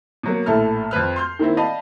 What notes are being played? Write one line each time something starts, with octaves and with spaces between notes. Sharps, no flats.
B2 F#3 A#3
A#1 A2 A3 A5 A#5 F6
F2 F3 B4 F6
C6 F6 G6
D#3 A#3 C4 E4
D5 D#5 F5 A5 B5